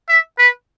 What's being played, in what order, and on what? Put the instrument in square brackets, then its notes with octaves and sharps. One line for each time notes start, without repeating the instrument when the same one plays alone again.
[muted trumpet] E5
B4